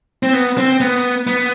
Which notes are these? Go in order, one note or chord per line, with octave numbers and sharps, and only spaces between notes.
C4
B3
C4
B3
B3